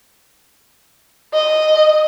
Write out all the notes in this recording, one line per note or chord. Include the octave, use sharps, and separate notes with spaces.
D#5